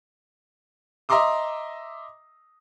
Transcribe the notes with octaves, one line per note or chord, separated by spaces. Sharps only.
D#5 E5 A#5 C6 D6 D#6